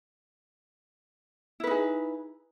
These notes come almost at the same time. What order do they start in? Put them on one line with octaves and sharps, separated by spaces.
E4 B4 D#4 G#4